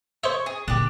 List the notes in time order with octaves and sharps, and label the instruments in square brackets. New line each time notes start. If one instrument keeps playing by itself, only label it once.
[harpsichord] C5 D#5 E5 [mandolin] C#5
[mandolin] G#4
[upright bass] A#2 D3 [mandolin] D4 G4